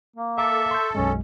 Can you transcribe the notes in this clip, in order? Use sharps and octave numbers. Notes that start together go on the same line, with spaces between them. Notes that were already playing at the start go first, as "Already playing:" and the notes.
A#3
A4 E5 F5 A#5 D6
C6 C#6 G6
B1 F#2 G#3 C#4